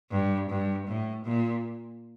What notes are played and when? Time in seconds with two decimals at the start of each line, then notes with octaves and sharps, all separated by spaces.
0.11 G2
0.49 G2
0.87 A2
1.25 A#2